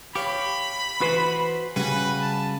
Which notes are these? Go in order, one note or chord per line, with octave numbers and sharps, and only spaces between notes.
G4 C#5 F5 B5 C#6
E3 F#4 B4 C5
C#3 G3 F#4 B4 G#5
A5